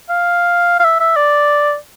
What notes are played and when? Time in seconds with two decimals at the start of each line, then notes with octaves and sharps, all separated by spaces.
0.10 F5
0.80 F5
0.84 E5
1.00 E5
1.16 D5